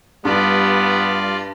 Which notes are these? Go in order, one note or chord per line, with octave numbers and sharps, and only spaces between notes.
G2 G3 B3 F4 D5